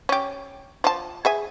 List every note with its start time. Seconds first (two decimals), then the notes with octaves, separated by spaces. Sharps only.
0.09 C#4 G4
0.84 F3 A5
1.25 G#4 E5 G#5